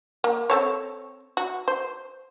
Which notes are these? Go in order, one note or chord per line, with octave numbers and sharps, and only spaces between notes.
A#3
C4 A4 C#5
F#4
C5